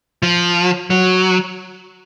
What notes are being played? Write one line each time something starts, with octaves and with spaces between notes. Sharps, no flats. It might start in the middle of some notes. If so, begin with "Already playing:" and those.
F3
F#3